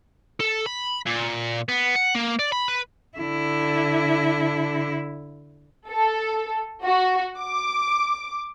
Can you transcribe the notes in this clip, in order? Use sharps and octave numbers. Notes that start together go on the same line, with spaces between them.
A4
B5
A#2
B3
F#5
A#3
D5
B5
B4
D3 E4
A4
F#4
D6